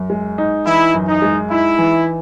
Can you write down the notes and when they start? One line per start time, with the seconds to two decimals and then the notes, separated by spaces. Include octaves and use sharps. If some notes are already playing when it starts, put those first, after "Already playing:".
Already playing: F#2
0.10 G#3
0.38 D#4
0.66 E3 E4
0.94 F#2
1.08 D#4
1.22 G#3
1.51 D#4 E4
1.78 E3